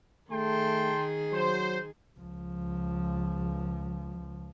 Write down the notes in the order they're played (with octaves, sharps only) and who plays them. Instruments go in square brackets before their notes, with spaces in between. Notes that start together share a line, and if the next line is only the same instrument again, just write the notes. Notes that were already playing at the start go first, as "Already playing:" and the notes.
[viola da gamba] D#3 G#4 [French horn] A3 [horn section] G5 A5 C6
[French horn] F#3 [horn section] C5
[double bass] C#2 F3